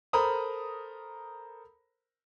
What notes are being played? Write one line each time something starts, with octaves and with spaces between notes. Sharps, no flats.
A4 A#4 C5 A#5 B5 D#6